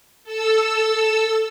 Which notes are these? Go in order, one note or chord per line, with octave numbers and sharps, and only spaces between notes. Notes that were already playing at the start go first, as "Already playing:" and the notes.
A4 E6